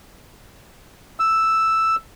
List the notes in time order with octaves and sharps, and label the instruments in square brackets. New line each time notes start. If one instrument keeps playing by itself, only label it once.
[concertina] E6